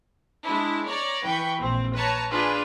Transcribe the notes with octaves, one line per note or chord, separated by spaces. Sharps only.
G#3 D4 E4
C#5 D5 A#5
E3 B4 G5 B5 C#6
A#1 C4
B4 C#5 A5 A#5
D4 F4 G#4 B4